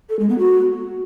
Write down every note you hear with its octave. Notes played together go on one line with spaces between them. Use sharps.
A4
G#3
B3
F#4